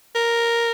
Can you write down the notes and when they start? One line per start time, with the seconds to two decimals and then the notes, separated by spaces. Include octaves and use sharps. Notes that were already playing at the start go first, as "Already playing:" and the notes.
0.15 A#4